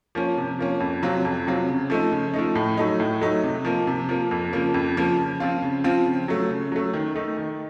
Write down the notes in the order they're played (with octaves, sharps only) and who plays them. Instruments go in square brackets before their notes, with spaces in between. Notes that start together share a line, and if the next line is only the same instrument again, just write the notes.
[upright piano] F3 A#3 C#4
C3
F3 A#3 C#4
F2
C3 F#3 C4 F4
F2
C3 F#3 C4 F4
C#3
F3 A3 D#4
C#3
F3 A3 D#4
A2
F#3 A3 D#4
A2
F#3 A3 D#4
C3
F3 A#3
C3
F3 A#3
F2
C#3 F3 A#3
F2
C#3 F3 A#3
C#3
F3 C4 F4
C#3
F3 C4 F4
C#3
F#3 A3
C#3
F#3 A3
D#3
A3 D#4
D#3